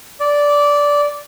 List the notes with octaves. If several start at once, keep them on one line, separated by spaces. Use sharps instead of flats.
D5